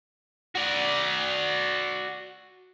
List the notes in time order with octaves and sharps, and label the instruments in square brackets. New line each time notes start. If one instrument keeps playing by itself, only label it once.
[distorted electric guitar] F#4 D5